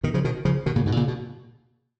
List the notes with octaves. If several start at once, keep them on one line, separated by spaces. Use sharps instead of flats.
B2 D#3
C#3 F3
B2 D#3
C#3 F3
B2 D#3
A#2 C#3
G#2 B2
A#2 C#3
B2